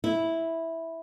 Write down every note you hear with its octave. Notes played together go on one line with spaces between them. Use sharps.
E4